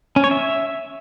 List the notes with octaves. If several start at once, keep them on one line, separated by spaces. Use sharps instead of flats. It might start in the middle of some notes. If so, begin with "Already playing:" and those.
C#4
C#5
E5